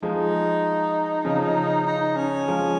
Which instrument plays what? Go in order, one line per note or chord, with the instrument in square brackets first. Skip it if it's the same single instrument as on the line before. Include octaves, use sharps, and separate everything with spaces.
[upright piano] F3 G#3 [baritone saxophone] D#4
[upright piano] C#3 F3
[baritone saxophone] D#4
C#4
[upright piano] F3 G#3